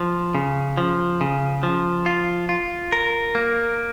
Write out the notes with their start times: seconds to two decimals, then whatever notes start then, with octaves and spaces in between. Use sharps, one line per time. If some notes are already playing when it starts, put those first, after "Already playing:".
Already playing: F3
0.35 C#3
0.77 F3
1.21 C#3
1.63 F3
2.06 F4
2.49 F4
2.92 A#4
3.35 A#3